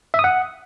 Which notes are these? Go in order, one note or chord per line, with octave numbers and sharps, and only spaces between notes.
E5
D#6
F#5